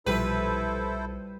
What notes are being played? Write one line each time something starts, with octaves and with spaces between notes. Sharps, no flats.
B1 A#2 F3 G3 E4 A4 B4 C5